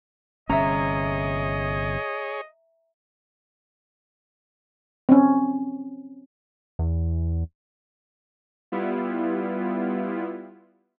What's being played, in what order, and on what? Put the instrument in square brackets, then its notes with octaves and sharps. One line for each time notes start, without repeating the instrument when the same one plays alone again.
[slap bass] G1 C3 C#4 [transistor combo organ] G#4 C#5 [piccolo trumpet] D#5 [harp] E5 A#5
[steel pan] C4 C#4
[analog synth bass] E2
[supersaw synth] G3 B3 E4 F4